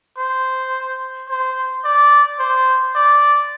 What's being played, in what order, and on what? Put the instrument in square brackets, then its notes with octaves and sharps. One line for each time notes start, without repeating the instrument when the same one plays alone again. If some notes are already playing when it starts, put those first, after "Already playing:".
[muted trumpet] C5
C5
D5
C5
D5